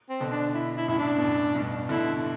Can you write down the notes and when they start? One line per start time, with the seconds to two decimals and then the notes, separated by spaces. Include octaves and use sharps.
0.10 C4
0.20 B2 D3
0.32 D4
0.54 E4
0.77 E4
0.88 F#2 A2 E4
0.99 D4
1.18 B2
1.22 F#2 A2
1.55 G2 B2
1.89 B2 D3 E4